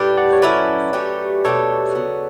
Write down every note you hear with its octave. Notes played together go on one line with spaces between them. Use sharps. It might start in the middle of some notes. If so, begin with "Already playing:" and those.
Already playing: A2 G3 D4 G4 B4 D5
D5 F#5
C#5
F#3 C#4 E4 A4 B4 D5
F#3 A3 C#4 G4
B2 A3 D4 G4 A4 C#5
C#3 F#3 B3